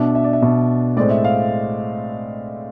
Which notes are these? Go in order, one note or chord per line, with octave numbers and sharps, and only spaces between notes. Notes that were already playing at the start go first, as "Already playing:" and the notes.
Already playing: B2 B3 D4 E5
E5
D5
E5
B2 B3 D4
A2 G#3 C4 D5
E5
F5